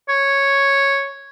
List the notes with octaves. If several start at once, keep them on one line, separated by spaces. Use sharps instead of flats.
C#5